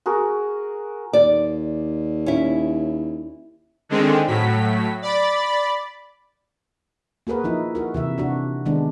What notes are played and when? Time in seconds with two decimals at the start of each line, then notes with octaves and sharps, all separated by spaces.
0.06 F#4 G#4 A#4
1.13 D#2 D5
2.26 C#4 E4
3.89 D3 D#3 G#3 C4
4.27 A2 F#3 B6
5.02 D5 B5 A6
7.27 A#3 F#4 G#4 A#4 B4
7.44 F3 D#4 E4
7.75 F#4 A#4
7.94 C3 E3 E5
8.18 C3 D4 F#4
8.66 D#3 G#3 B3 D4